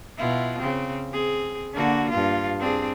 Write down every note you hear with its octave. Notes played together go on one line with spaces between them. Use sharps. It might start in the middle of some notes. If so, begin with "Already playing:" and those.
B2 E4 F4
C#3 C4
C4 G#4
D3 A#3 F#4
G2 F4
C4 D4 G#4